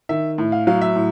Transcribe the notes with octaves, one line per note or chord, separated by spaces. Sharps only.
D#3 E5
A2
F5
F#3 F5
E5
A2